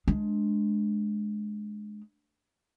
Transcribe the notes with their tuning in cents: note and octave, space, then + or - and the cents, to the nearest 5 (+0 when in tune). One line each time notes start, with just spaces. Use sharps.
G#3 +15 D4 +0